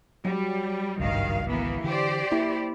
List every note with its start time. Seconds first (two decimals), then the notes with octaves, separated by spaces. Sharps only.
0.25 F#3 G3
1.00 G#1 C#2 G2 D#3 F5
1.46 E3 A#3 B3
1.84 D3 E3 G4 C5 D5
2.32 A#3 E4